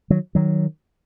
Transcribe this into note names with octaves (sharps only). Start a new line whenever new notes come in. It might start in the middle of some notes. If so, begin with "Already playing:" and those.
D#3 F#3
D#3 F#3